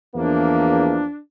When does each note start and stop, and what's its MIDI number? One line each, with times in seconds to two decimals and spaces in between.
0.15 1.03 40
0.15 1.03 53
0.15 1.03 58
0.15 1.18 62